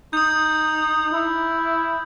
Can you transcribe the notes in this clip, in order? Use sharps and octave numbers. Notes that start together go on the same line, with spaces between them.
D#4 D#6 G6
E4